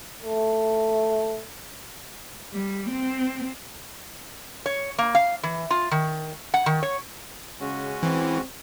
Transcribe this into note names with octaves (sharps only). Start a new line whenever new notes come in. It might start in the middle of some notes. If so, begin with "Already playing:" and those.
A3
G3
C4
C#5
A#3
F5
E3
F4
D#3
F#5
D#3
C#5
C#3 G#3 C#4 F#4
E3 C4